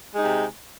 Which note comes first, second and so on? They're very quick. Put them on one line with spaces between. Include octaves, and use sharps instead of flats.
G#3 D#4 C3